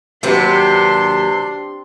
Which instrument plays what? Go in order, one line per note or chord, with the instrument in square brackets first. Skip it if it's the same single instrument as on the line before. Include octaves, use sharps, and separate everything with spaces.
[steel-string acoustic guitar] D#2 F#3 B4 [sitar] C3 [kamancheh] D4 C6 [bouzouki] G4